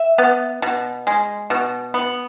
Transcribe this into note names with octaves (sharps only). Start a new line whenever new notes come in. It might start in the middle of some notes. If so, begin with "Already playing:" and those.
Already playing: E5
B3
B2
G#3
B2
B3